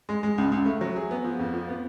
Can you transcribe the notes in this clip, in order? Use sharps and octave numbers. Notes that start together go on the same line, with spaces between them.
G#3
G#3
C#2
C#2
A3
F#3
G#4
B3
F3
F2
F3
B3